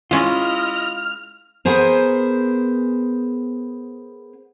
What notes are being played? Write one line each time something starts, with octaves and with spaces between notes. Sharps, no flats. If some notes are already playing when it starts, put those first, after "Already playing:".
G#3 C#4 E4 F4 D#5 F6
B3 G#4 A#4 C5 G#5